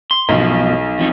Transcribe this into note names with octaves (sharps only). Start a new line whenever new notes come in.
C6
B1 F#2 B2 F3
F2 F3 D#4